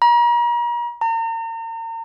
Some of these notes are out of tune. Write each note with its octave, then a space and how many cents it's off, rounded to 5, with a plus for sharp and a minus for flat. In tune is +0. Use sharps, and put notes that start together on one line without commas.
A#5 +40
A#5 -40